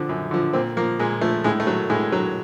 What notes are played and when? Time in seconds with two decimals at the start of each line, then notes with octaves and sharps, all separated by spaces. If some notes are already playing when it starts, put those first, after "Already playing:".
Already playing: D3 F3 C4
0.09 F#2
0.31 D3 F3
0.53 A#2 C4
0.77 F3 A#3
0.99 A#2 G#3
1.21 F3 A3
1.44 A2 G#3
1.60 A3
1.67 F#3
1.90 A2 G#3
2.12 F#3